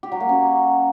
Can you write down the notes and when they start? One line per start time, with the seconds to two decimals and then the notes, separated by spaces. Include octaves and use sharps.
0.03 G4
0.12 F#3
0.20 A#3
0.29 C#4